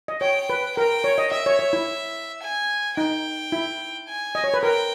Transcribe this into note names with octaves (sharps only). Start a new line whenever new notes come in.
D#5
C#5 G5
B4
A#4 G5
C#5
D#5
D#5 E5
C#5
C#5
E4
G#5
D#4 G5
E4
G#5
D#5
C#5
B4
A#4 G5